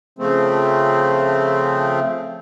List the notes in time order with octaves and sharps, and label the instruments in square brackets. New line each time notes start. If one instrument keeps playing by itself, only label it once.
[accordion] C#3 F3 A3 C4